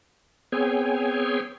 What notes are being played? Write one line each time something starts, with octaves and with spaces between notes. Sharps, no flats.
B3 C4 G#4 C#5 G5 G#5